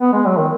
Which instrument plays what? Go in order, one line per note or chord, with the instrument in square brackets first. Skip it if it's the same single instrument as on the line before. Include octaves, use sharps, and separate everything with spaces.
[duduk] B3
G#3
F#3
D#3